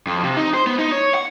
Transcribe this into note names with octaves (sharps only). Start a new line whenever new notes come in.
F2
C3
D#4
C5
B3
D#4
C#5
F#5